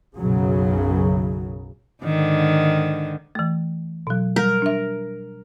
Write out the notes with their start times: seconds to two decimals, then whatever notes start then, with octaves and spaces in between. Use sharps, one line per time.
0.15 B1 F#2 C#3 F#3
2.04 G#2 D3 D#3
3.35 E3 A3
4.07 B2 F#3
4.36 G3 A#4
4.62 D4 E5